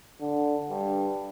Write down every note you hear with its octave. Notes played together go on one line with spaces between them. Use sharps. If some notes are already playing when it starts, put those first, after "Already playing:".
D3
G2